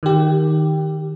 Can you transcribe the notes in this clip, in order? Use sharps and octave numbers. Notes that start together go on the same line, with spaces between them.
D#3 G4